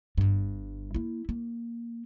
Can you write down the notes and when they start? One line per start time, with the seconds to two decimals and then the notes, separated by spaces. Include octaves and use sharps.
0.17 G1 G2
0.94 A#3 E4
1.29 A#3